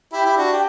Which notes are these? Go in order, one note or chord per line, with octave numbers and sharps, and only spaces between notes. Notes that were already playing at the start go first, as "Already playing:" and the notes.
E4 G4
E4
D4 F#4
G4